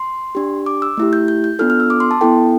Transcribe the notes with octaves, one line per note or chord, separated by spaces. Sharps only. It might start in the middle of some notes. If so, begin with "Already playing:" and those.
Already playing: C6
D4 G4
D6
E6
A3 E4 G4
G6
G6
G6
B3 D4 F4 A4 F6
F6
E6
D6
C6
A5
B3 E4 A4 G5